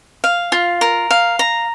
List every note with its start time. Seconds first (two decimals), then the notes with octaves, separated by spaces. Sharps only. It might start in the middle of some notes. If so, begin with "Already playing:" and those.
0.24 F5
0.52 F4
0.81 A#4
1.11 F5
1.39 A#5